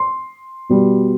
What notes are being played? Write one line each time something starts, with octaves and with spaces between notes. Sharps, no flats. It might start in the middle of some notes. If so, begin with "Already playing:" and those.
Already playing: C6
B2 G3 B3